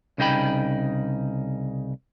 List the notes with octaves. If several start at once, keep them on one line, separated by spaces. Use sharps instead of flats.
C2 C#3 D#4 F4 G5 B5